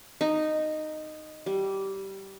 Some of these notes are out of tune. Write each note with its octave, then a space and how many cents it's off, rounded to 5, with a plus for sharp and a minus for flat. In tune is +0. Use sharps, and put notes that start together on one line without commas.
D#4 -10
G3 -15